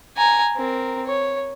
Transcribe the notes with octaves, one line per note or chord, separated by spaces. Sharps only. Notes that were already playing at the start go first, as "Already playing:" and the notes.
G#5 A#5
C4 A#4
C#5